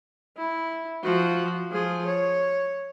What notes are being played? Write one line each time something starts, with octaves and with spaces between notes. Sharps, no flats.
E4
F3 F#4
F3 G#4
C#5